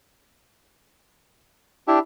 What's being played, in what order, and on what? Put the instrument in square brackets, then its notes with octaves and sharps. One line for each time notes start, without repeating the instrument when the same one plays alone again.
[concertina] D4 G4 [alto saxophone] E4